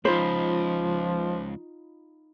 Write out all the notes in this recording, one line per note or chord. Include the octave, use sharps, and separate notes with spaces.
C#2 F3 D#4 F4 C5 B5